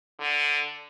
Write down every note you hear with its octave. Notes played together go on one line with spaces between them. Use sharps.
D3